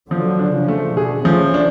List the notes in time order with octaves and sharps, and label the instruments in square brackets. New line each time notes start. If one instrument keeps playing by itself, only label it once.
[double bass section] D3 F#3 [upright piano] F3
[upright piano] D4
[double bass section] C#3 F3
[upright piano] A3
[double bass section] B2 D3 [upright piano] G#4
[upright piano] F3 [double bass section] A3 C#4
[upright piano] D4